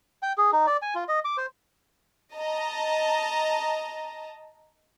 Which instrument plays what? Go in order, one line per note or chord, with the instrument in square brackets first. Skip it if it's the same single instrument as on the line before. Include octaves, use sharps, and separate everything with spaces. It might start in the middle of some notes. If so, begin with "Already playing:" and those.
[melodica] G5
G#4
D#4
D5
G#5
F4
D#5
D6
C5
[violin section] D#5 A5 A#5